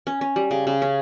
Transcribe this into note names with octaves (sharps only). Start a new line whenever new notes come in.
C#4
C#4
G3
C#3
C#3
C#4